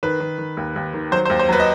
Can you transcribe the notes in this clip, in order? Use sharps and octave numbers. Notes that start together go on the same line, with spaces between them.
D#3 B4
D#3
D#3
D#2
D#2
D#3
F#3 C5
C5
D#2
C5
F#3 B4
D#5